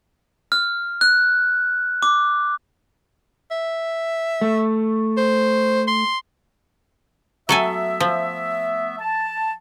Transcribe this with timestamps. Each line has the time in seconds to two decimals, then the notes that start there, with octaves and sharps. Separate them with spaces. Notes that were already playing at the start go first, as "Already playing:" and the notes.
0.52 F6
1.01 F#6
2.03 D6
3.51 E5
4.41 A3
5.17 C5
5.88 C6
7.49 F#3 A3 B3 A4 E5 G#5
8.00 F3
8.98 A5